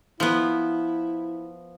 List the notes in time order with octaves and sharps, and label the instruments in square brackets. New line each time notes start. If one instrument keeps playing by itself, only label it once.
[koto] F3 B3 [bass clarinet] E4